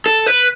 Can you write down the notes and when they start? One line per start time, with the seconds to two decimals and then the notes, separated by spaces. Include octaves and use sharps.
0.06 A4
0.26 B4